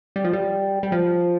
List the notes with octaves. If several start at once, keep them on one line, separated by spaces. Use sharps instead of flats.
G3
F3
G3
G3
F3